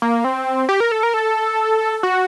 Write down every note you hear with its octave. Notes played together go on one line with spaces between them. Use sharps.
A#3
C4
G4
A#4
A4
A#4
A4
F#4